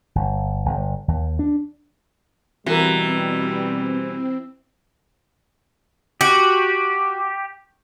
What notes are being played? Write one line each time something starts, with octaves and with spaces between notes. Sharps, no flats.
G1
G1
D#2
D4
B2 E3 G3 C4 F#4 A#4
F#4 G4